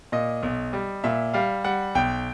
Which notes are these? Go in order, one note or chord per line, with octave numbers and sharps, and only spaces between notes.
A#2 D#5
B1
G3
A#2 E5
G3 F5
G3 F#5
B1 G5